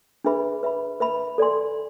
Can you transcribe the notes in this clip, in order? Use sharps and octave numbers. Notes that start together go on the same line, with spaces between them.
D4 G#4 B4 E5 B5
B4 E5 B5
B4 E5 B5
A4 D5 G#5 C6